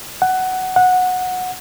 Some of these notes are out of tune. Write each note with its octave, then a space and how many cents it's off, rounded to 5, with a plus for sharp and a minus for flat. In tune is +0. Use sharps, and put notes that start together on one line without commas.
F#5 +15
F#5 -10